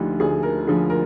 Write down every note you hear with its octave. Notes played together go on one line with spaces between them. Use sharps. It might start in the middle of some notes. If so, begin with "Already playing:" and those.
Already playing: D2 D3 F3 D#4 F4 G4
D2 G#4
A#4
D3 F3 G#4
A#4